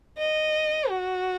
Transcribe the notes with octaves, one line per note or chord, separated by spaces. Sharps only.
D#5
F#4